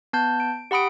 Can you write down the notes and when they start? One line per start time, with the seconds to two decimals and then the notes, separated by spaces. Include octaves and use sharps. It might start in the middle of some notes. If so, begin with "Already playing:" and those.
0.13 B3 A5 G6
0.40 D7
0.71 G4 F#5 B5 D#6 D7